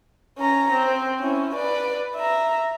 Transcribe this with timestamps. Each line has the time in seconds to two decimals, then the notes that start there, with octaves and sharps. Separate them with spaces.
0.38 C#4 A#5
0.72 C4
1.20 C#4 E4
1.55 B4 D5
2.16 E5 A#5